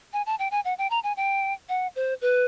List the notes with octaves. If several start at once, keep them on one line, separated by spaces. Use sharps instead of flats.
G#5
A5
G5
G#5
F#5
G5
A#5
G#5
G5
F#5
C5
B4